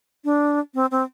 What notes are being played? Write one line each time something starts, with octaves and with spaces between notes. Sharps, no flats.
D4
C4
C4